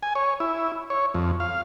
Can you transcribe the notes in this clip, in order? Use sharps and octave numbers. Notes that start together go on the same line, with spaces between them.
G#5
C#5
E4
C#5
F2
F5